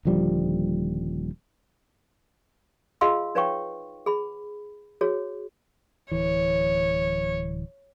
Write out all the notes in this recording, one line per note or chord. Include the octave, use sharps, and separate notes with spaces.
D#1 D3 F3 G3
F4 G#4 D#5 F5 C6 E6
D#4 B4 C#5 F5 G5 C#6
G#4 B5
F#4 G#4 C#5
D1 E3 C#5